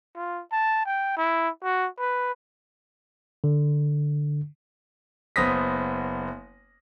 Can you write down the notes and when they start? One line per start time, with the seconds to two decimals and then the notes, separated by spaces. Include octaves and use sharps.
0.16 F4
0.52 A5
0.86 G5
1.17 E4
1.64 F#4
1.99 B4
3.44 D3
5.36 F#1 B3 C5 D#6 A#6 B6